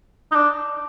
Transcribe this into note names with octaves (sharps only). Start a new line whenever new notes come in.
D#4
D4